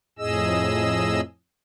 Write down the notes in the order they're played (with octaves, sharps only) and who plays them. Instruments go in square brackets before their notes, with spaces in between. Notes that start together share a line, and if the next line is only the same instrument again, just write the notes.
[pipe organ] F2 A2 G#4 D#5 E6